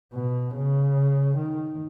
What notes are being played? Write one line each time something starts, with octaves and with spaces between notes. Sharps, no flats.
B2
C#3
D#3